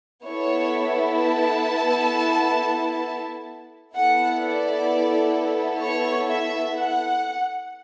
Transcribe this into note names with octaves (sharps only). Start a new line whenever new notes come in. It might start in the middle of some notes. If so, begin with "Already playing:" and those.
B3 E4 A4 C#5
A5
B3 E4 A4 F#5
D5
C#5
E5
F#5